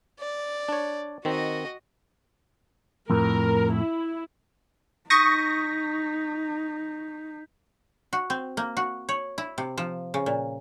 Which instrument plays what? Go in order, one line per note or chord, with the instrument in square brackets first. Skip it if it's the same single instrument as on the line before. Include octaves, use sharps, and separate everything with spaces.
[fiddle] D5
[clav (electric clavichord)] D4 C#5
[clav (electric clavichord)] D#3 C4 [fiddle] F#4 D#5
[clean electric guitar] F2 A2 [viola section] A#4
[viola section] E4
[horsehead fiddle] D#4 [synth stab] C#6 D#6 A#6 [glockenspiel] G6 B6
[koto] F#4
C4
A#3
F#4
C#5
E4
C3
F3
C#3
A#2